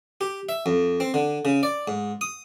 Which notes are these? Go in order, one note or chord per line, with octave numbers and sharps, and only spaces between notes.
G4
E5
F2
C4
D3
C#3
D5
G#2
D#6